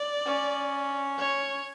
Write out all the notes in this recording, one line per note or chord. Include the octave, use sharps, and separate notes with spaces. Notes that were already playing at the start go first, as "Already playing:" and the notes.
Already playing: D5
C#4
C#5